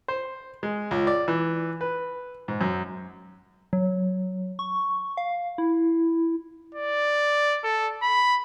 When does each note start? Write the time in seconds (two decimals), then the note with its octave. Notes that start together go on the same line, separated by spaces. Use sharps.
0.08 C5
0.63 G#3
0.91 C#2
1.07 D5
1.28 E3
1.81 B4
2.48 G#2
2.61 F#2
3.73 F#3
4.59 C#6
5.17 F5
5.58 E4
6.75 D5
7.64 A4
8.03 B5